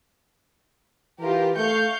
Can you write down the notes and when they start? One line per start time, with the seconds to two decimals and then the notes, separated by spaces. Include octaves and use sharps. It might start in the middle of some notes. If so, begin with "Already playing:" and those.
1.20 E3 F4 G4 A#4
1.57 A3 F5 C#6 G6